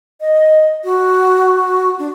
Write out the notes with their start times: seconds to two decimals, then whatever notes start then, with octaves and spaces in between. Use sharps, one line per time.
0.21 D#5
0.84 F#4
1.99 D4